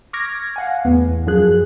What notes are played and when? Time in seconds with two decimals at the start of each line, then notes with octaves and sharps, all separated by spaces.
0.13 C#6 D6 F6 G#6 A#6
0.56 F5 F#5 G#5
0.85 E2 A2 B3
1.27 F#2 F3 F#3 G#4 F#6